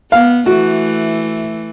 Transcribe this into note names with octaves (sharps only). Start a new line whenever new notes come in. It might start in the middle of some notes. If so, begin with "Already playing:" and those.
B3 F5
E3 A3 F#4